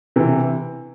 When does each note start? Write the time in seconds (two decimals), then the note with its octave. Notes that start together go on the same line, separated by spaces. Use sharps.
0.16 C3 E3